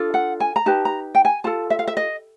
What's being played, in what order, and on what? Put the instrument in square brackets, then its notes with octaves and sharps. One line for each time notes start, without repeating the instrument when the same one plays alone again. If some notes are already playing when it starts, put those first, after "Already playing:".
Already playing: [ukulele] D4 F4 A4
F#5
G#5
A#5
D#4 G4 B4 A5
A#5
G5
G#5
F4 A4 A5
E5
F5
E5
D#5